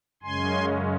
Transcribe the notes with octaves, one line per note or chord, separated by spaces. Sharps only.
F#2 C#3 G#3 C#4 G#5 C6